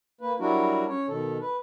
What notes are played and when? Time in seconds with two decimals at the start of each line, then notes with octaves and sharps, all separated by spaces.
0.21 A#3 B4
0.40 F#3 G3 D4 E4 F#4 A#4
0.88 C#4 C#5
1.08 B2 D#3 A4
1.41 B4